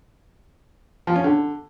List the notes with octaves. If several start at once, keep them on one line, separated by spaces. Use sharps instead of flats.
F3
C#4
D3